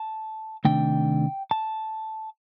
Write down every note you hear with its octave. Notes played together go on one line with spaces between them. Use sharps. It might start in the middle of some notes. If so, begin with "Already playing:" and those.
Already playing: A5
C3 D#3 A3 D4 G5
A5